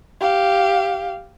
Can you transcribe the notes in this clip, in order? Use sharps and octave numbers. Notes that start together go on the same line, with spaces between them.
G4 F5